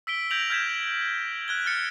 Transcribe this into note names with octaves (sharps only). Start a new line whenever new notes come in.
E6 B6 D7 G7
G6 G#6 A#6 D7 F7 F#7
F6 G6 G#6 B6 E7
F#6 G#6 G7
F6 A6 C#7